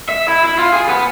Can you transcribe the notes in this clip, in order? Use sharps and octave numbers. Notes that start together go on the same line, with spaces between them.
E5
E4
E4
F4
G#4
B3